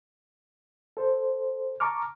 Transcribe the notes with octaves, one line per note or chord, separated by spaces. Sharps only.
A4 C5
A5 A#5 C#6 D6 F6